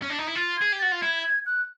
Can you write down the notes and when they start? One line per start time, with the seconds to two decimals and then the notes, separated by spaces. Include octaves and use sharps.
0.02 C#4
0.10 D4
0.19 D#4
0.27 E4
0.35 F4 A6
0.57 G#4 G#6
0.72 G4
0.79 F#4 A6
0.92 F4
1.01 E4 G#6
1.24 G#6
1.46 F#6